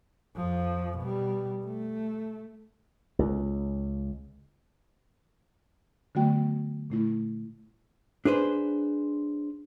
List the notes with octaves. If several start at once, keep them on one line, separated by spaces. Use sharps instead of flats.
F2 F3
B2 G3
A3
C#2
D3 F#3 A3 B3 F#4 G5
A#2 A3 E4
D4 G#4 B4 C5